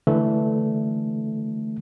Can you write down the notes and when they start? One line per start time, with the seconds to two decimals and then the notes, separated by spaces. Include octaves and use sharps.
0.07 D3 E3 A3